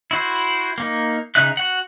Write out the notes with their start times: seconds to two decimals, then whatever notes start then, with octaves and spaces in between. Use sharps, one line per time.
0.11 E4 F#4 C5
0.78 A#3 D#4
1.35 C#3 D#4 E5 F#6
1.57 F#4 F#5